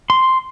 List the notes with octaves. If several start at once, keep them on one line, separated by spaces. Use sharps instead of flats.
C6